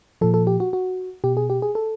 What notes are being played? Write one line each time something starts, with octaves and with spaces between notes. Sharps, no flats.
A#2 F3 A4
A4
G4
F#4
F#4
B2 G4
G#4
G4
G#4
A4